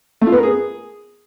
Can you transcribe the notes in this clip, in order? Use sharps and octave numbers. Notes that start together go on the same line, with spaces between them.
A3
F4
B3
A#4
G#4